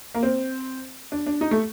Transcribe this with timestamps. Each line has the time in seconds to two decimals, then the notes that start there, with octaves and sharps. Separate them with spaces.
0.15 A#3
0.23 C4
1.12 D4
1.26 D4
1.41 D#4
1.51 A3